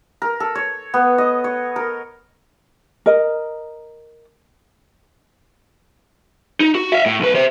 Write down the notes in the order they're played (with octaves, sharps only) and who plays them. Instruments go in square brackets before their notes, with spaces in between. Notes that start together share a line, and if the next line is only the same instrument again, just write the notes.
[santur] A#4
A4
C#5
B3
D#5
C#5
A#4
[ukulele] A#4 D#5
[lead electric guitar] D#4
F#4
E5 F5
A2
B1 B4
C5 E5